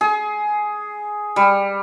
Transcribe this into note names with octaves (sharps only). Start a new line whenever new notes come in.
G#4
G3